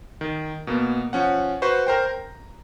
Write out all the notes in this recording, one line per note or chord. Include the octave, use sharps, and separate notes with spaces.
D#3
B2 A#3 B3
F3 C#4 F#5
F#4 B4 C5 C#6
A#4 C5 G5
A#5